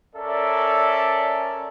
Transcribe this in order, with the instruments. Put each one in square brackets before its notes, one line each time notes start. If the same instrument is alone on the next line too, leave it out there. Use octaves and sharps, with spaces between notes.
[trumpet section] C#4 A4 A#4 D5 E5